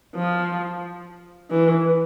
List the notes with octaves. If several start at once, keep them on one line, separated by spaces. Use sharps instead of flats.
F3
E3